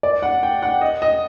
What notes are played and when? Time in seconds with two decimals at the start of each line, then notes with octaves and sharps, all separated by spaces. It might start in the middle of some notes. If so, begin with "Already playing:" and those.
0.03 D5
0.22 F#5
0.43 G5
0.62 F#5
0.81 D#5
1.02 D#5